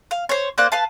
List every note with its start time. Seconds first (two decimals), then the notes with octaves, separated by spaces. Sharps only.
0.11 F5
0.29 C5 C#5
0.58 A#3 C5 D5 F#6
0.72 B4 F5 A5